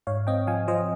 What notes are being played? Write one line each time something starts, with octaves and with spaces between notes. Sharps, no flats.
G#2 C#5 F5
C4 D#5 G5
F3 F5 G#5
F3 C5 D#5